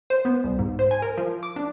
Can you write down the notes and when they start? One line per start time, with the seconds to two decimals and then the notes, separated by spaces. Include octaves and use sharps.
0.10 C5
0.25 B3
0.44 C2
0.59 G#2
0.79 C5
0.91 G#5
1.02 A#4
1.17 F3
1.43 D6
1.56 D4